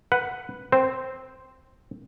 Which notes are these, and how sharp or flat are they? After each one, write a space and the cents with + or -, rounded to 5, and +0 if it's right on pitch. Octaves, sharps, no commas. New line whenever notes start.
B4 +5 F#5 +0
C4 +0 C5 -5